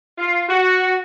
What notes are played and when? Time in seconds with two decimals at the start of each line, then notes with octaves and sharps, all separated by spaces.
0.18 F4
0.49 F#4